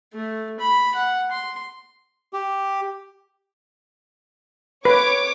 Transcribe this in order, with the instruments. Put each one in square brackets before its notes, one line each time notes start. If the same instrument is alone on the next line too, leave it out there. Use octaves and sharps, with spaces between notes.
[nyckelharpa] A3
B5
F#5
C6
[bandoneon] G4
[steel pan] B4 [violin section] C#5 D6